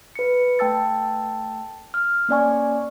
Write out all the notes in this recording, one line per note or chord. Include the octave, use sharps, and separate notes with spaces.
B4 C#7
A3 G5 A5 E6 A6
F6
A#3 C#4 D5 G#5 C#6